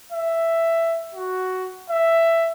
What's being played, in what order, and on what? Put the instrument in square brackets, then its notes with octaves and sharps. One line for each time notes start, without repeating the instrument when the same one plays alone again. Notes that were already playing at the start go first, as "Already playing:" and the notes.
[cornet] E5
F#4
E5